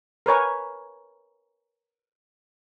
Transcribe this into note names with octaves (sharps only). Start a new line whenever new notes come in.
A#4 B4 C#5 G#5